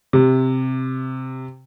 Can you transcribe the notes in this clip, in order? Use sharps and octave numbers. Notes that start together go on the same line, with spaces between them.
C3